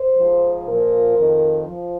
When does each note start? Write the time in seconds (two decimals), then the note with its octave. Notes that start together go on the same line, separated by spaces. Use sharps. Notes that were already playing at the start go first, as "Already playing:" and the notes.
Already playing: C5
0.17 G#2 F3
0.67 A#2 F3 A#4
1.17 F2 D#3
1.67 F3